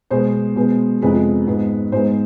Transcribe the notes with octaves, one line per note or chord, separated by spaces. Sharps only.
B2 G#3 B3 C5
B2 G#3 B3
F2 C3 G#3 B3 B4
G#2 G#3 B3
G#2 G#3 B3 C5